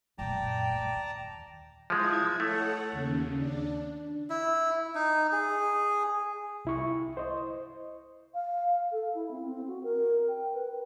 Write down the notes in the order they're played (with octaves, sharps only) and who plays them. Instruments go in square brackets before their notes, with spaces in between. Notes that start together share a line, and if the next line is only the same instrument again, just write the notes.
[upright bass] F#2 A#2 [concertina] D5 A5 A#5 [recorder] G5
[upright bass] D#2
[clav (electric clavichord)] F3 G#3 [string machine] E4 G#6
[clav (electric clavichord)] A3 [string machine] A4 C#5 F#5
[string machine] D#2 C#3
D4
[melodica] E4
D#4
G#4
[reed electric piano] C2 E4 C#6
C5 D#5
[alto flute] F5
A4
E4
C4
C4
F#4
A#4
G5
B4